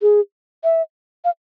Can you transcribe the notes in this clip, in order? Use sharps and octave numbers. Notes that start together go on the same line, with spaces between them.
G#4
E5
F5